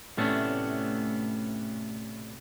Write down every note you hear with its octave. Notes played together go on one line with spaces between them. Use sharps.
A2 C3 A3 B3 C#4 D4